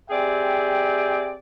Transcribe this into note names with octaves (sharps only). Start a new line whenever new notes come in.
C4 G4 G#4 D5 E5 G5